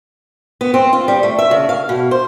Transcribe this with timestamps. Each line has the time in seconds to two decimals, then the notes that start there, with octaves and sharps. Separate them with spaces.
0.61 B3
0.74 C4
0.93 F4
1.08 G3
1.23 A3
1.39 E5
1.51 C#3
1.69 F5
1.89 B2
2.11 C5